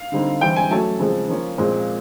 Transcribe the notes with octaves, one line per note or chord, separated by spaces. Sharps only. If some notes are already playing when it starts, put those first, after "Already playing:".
Already playing: F5
D3 G3 C4 D#4
E3 G3 C4 G5
G#5
F#3 A3 C#4 A5
C#3 F3 G#3 C4
F3 A#3 C#4
A#2 F3 G#3 C4